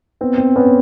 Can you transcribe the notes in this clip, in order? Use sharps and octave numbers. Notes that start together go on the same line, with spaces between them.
B3 C4
C4
B3 C#4